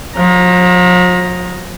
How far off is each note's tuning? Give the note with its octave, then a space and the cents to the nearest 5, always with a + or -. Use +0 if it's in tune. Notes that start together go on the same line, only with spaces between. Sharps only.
F3 +45 A#5 +0